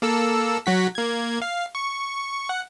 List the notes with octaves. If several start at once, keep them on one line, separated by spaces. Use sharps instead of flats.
A#3 A4 E6
F#3 F#4 B6
A#3 G#6
F5
C#6
F#5